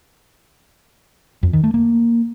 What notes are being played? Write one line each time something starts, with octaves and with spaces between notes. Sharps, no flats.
F2
D#3
A3
A#3